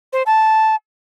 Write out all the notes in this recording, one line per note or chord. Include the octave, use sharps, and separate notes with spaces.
C5
A5